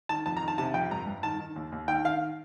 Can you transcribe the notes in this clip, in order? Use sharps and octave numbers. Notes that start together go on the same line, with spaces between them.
D#3 A5
F2 A5
A#5
D#3
A5
C3 A5
F2 G5
G2 A#5
G2
D#3 A5
D#3
D#2
D#2
D#3 G5
D#3 F5